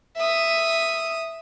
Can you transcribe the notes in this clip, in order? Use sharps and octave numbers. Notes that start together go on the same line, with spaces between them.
E5 D#6